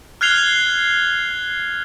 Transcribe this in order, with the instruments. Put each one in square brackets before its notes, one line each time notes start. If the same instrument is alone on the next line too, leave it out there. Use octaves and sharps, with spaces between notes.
[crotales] F6 F#6 G#6 C7 F7 G7